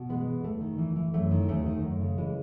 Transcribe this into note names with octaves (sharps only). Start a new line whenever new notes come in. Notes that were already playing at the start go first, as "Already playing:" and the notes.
Already playing: B2
E3 G#3 B3
E3
D#2 A3
D#3
E3
E3
F#2 A3
D#3
D#2 A3
D#3
F#2
C#3
E3 G#3